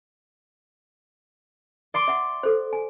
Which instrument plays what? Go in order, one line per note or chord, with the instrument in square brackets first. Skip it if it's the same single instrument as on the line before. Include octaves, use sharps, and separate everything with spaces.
[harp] D5 C6 D6
[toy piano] E5 F#5
A4 C5
G#5